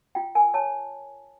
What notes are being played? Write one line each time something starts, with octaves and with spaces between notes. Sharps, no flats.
F4 G5
A#4 G#5
C#5 A5